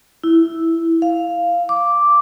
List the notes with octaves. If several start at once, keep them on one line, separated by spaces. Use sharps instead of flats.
E4
F5
D6